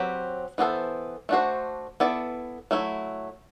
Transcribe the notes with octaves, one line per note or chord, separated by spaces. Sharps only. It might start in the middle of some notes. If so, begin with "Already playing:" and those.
Already playing: F#3 C4 G4 B4
E3 B3 D4 A4 C5
A3 D4 F#4 C5
B3 E4 A4 D5
F#3 A3 E4